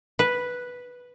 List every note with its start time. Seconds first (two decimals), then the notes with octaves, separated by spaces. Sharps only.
0.19 B4